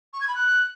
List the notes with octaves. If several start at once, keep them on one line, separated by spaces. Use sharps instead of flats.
C#6
G#6
B5
F#6